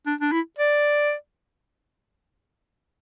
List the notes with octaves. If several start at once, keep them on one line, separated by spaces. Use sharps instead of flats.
D4
D4
E4
D5